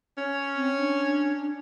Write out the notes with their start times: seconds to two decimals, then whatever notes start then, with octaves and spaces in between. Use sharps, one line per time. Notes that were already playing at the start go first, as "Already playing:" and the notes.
0.18 C#4
0.55 C4
0.78 D4